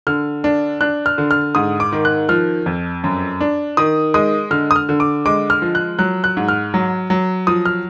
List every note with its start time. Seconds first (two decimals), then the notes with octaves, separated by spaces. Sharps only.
0.07 D3 F6
0.44 D4
0.81 D4 F#6
1.06 F6
1.18 D3
1.31 F6
1.55 G#2 D#6
1.80 D6
1.92 D#3
2.05 F#6
2.29 F3 F6
2.66 F2
3.04 F#2
3.41 D4
3.77 D#3 D#6
4.14 G#3 D#6
4.51 D3 F6
4.71 D#6
4.76 F6
4.89 D3
5.00 D6
5.25 G#3 D6
5.50 F6
5.62 F3
5.75 F#6
5.99 F#3 F#6
6.24 F#6
6.37 G#2
6.48 F6
6.74 F#3
7.10 F#3
7.47 F3 D#6
7.66 F6